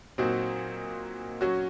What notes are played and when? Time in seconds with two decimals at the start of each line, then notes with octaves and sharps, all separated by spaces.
0.18 A#2 F#3 C4 D#4 F#4
1.41 F#3 C#4 F#4